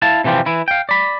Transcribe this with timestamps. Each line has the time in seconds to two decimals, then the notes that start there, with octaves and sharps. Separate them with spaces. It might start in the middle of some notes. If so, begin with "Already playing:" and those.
0.02 E4 F5 A5
0.24 C3 E3 F3 G3 C4
0.46 E3 E4
0.68 F5 G5
0.89 D5 B5